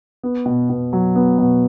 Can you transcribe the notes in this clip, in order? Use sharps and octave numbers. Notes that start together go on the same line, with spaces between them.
B3
B2
B2
F#3
B3
B2